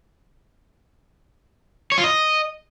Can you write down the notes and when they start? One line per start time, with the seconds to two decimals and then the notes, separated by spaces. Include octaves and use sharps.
1.92 C#5
1.98 F4
2.04 D#5